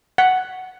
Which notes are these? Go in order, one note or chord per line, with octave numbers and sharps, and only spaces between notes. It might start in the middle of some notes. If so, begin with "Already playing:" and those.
F#5